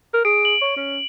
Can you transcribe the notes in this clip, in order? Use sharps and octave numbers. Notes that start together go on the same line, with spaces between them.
A#4
G#4 D7
F#7
C#5
C#4